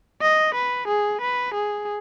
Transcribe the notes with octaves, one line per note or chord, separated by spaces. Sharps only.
D#5
B4
G#4
B4
G#4